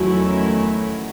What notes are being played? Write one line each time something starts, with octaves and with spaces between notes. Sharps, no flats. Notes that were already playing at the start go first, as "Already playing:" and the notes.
Already playing: E2 D#3 F#3 A3 C#4 E4